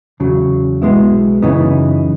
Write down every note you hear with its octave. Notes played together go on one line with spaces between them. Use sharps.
E2 C#3 F#3
B1 B2 G#3 B3 E4
F#2 C#3 E3 B3 D#4